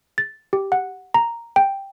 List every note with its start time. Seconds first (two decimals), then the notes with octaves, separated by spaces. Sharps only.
0.18 A6
0.53 G4
0.72 F#5
1.14 A#5
1.56 G5